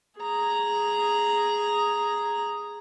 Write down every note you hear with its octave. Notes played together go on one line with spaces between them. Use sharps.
G#4 A#5